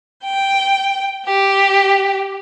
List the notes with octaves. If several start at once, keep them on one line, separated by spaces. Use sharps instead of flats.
G5
G4